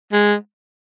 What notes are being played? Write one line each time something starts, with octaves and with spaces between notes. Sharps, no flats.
G#3